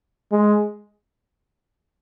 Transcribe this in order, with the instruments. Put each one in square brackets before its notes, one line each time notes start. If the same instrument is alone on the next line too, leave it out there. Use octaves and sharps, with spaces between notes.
[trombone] G#3